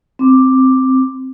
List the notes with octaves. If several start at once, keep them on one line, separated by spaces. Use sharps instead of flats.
C4 D6